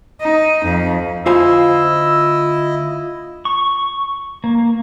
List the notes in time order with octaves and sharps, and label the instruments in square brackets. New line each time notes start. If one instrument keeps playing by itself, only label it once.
[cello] D#4
F2
[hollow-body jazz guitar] D2 C5 G#5 [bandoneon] E4 D#5 [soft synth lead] F4 [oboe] E6
[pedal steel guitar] C#6
A#3